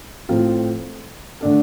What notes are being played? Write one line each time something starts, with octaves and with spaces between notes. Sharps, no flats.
A2 F3 C4 F4 A4
D3 A3 D4 A4